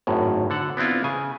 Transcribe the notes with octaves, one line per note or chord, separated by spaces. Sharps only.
G#1 F#2 A2
D3 A4 F#5
B3 C4 D4 E4 F4
C#3 G#5